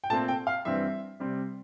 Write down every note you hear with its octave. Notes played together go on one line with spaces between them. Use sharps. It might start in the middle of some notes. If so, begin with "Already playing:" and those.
G5
A#2 A3 C4 A5
G5
F5
G2 E3 G3 C4 E5
C3 G3 C4